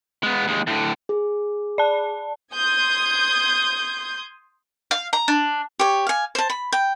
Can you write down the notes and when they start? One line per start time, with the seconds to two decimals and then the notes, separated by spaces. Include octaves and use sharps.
0.23 G#3 B3
0.48 D#2 G#3
0.67 A2 D3
1.09 G#4
1.78 D5 A5
2.52 C6 D#6 G6 G#6
4.91 F5
5.13 A#5
5.28 D4
5.79 G4 C#5
6.07 F5 G#5
6.35 C5 A5
6.50 B5
6.72 G5